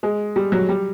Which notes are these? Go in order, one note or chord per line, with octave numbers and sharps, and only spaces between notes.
G#3
G3
F#3
G3